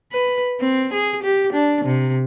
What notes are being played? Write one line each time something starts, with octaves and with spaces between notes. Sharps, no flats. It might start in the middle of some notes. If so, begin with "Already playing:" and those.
B4
C4
G#4
G4
D4
C3